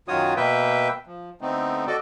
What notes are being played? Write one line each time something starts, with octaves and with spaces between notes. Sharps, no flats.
F#2 D#3 F4 F#4 C#5 D#6
B2 A#3 B4 E5 G5
F3
D3 A3 B3 C4 D#4
F#4 A4 D5 D#5